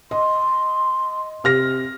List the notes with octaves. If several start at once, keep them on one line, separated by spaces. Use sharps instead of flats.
D#5 C6
C3 F6 A#6